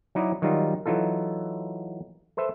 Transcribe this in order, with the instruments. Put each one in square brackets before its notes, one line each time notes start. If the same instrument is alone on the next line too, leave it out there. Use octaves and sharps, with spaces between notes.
[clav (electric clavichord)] F#3 D#4 E4 D5 D#5 A#5
D#3 F#3 G3 D#4 F4
E3 F#3 D#4 F4 A4
A4 B4 C5 E5